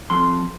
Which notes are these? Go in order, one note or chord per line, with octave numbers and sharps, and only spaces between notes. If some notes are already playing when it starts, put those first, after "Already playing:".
F2 C6